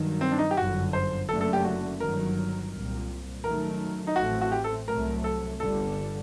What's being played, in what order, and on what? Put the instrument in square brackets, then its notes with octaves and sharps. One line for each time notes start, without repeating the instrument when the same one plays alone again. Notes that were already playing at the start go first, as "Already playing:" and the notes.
Already playing: [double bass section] G2 D#3 F#3
[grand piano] C4
D4
D#4
G4
[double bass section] G1 F#2 D3 [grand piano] F#4
[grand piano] C5
[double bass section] F#1 F#2 D3 A3 [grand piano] A4
[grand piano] A4
G4
F#4
[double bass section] G1 G2 D#3 F#3 [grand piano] A#4
[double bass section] C2 A#2 G3
[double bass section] F#2 D#3 F#3 A3 [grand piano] A#4
[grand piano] D#4
[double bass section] A1 A2 A3 C4 [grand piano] F#4
[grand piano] F#4
G4
A4
[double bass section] C2 C3 F#3 A3 [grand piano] A#4
[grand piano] A4
[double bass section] G1 G2 D3 G3 [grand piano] A4